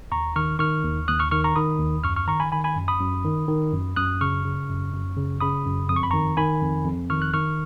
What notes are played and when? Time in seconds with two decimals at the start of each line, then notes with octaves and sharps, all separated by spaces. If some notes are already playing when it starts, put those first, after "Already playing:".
0.12 D#2 A#5 C#6
0.36 D#3 C#6 F6
0.59 D#3 C#6 F6
0.84 D#2
1.08 D#2 D#6 F#6
1.19 C#6 F6
1.31 D#3 C#6 F6
1.44 A#5 C#6
1.56 D#3 B5 D#6
1.79 D#2
2.04 F#2 C#6 F6
2.16 C#6 F6
2.28 D#3 A#5 C#6
2.40 G#5 B5
2.52 D#3 G#5 B5
2.64 G#5 B5
2.77 F#2
2.88 B5 D#6
3.00 F#2
3.25 D#3
3.48 D#3
3.72 F#2
3.96 F#2 D#6 F#6
4.21 C#3 C#6 F6
4.45 C#3
4.69 F#2
4.93 F#2
5.17 C#3
5.41 C#3 B5 D#6
5.65 F#2
5.89 F2 D#6
5.96 C#6
6.03 B5
6.11 D#3 A#5 C#6
6.37 D#3 G#5 B5
6.62 F2
6.85 F2
7.10 D#3 C#6 F6
7.22 F#6
7.33 D#3 C#6 F6